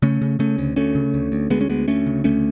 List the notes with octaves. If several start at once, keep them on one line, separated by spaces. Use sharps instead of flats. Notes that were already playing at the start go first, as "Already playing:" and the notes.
C#3 A3 C#4
C#3
C#3 A3 C#4
D2
D2 A3 C#4
C#3
D2
D2
D2 G#3 B3
C#4
D2 G#3 B3
D2 A3 C#4
C#3
D2 A3 C#4